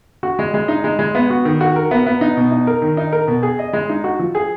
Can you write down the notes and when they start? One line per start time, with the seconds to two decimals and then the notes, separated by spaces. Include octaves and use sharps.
0.23 F#4
0.39 G#3
0.54 G#3
0.68 D#4
0.84 G#3
0.99 G#3
1.15 B3
1.30 F#4
1.45 D#3
1.61 F#4
1.76 A#4
1.91 B3
2.06 B3
2.21 D#4
2.37 B2
2.51 D#4
2.67 A#4
2.82 D#3
2.97 D#4
3.12 A#4
3.28 B2
3.43 G#4
3.59 D#5
3.73 G#3
3.89 D#4
4.04 F#4
4.19 F3
4.35 G#4